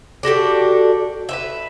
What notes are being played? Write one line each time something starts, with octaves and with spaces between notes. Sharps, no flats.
D4 F#4 G4 A4
B4 C5 E5